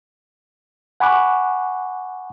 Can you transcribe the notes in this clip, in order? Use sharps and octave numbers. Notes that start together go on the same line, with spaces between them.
F#5 G#5 B5 C#6 D6 F#6